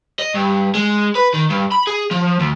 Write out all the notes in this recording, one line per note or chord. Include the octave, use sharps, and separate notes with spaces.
D#5
G2
G#3
B4
D#3
G2
B5
G#4
F3
D2